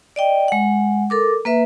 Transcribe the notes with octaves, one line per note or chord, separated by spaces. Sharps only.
D5 D#5 G5
G#3 F#5
A4 A#4 D6
A#3 B4 E5